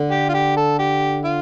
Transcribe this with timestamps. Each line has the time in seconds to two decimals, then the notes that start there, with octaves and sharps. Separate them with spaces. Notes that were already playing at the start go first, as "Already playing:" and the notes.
Already playing: D3
0.11 G4
0.29 F4
0.34 G4
0.57 A4
0.79 G4
1.24 F4